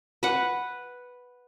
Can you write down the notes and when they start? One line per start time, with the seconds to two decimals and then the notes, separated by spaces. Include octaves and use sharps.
0.23 B4 F#5